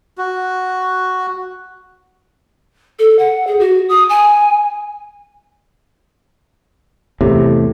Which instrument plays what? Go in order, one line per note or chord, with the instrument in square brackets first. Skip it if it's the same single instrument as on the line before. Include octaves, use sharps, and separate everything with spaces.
[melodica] F#4
[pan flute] A4
F#5
G#4
F#4
D#6
G#5
[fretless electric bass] E2 A2 [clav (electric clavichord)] C3